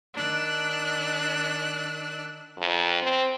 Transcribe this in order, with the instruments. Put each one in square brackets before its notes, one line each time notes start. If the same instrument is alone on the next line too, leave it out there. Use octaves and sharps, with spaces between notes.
[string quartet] D#3 D4 E6 F#6
[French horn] F2
C4